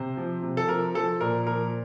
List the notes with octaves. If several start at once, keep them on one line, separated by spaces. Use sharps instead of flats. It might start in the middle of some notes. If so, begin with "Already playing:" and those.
Already playing: C3 C5
F3
C3
A4
F3 A#4
F3 A4
A#2 A#4
F3 A#4